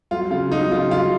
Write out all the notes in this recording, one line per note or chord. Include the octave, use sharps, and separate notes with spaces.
F#3 F4
C#3 F4
F#3 D#4
C#3 F4
F#3 F4